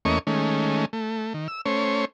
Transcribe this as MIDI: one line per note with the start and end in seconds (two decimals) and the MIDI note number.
0.05 0.19 40
0.05 0.19 57
0.05 0.19 58
0.05 0.19 61
0.05 0.19 75
0.05 0.19 85
0.27 0.85 51
0.27 0.85 56
0.27 0.85 57
0.27 0.85 61
0.93 1.33 57
1.34 1.48 51
1.48 1.61 88
1.66 2.05 57
1.66 2.05 61
1.66 2.05 72
1.66 2.05 73